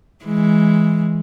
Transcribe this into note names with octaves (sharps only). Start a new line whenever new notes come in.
E3 G#3